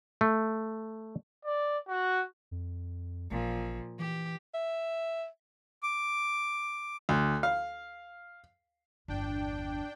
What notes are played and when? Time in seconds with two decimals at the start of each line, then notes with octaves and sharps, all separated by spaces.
0.21 A3
1.45 D5
1.88 F#4
2.51 F2
3.31 A1 A#2 F3
3.99 E3 G4
4.54 E5
5.83 D6
7.09 D2
7.43 F5
9.08 G1 E2 D4 G5